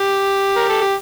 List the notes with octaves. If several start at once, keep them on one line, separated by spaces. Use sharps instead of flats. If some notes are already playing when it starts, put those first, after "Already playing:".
Already playing: G4
A#4
A4
G4